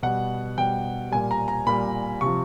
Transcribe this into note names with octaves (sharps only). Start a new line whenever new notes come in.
B2 G3 F#5
B2 G3 G5
A#2 G3 G#5
A#5
A#5
A#2 G3 B5
C3 F3 C#6